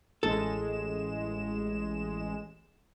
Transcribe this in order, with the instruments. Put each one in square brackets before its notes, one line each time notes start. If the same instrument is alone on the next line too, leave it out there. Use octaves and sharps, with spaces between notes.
[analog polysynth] A1 G#3 E7 [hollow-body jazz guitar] A4